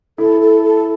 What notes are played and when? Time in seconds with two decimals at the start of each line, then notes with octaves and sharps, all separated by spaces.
0.18 E4 A4
0.40 A4
0.63 A4